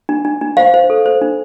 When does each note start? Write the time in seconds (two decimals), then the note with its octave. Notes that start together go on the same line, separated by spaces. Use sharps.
0.09 D4
0.25 D4
0.41 D4
0.57 C5 F5
0.74 C5
0.90 A4
1.06 C5
1.22 D4